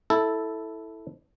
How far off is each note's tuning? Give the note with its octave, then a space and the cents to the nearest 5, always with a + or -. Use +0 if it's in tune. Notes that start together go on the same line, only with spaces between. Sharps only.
E4 -10 A4 +0